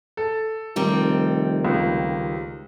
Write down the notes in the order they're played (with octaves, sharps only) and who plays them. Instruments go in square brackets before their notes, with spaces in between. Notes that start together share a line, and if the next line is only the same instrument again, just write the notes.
[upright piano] A4
[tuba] F1 [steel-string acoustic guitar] D#3 G3 C4
[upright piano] C#2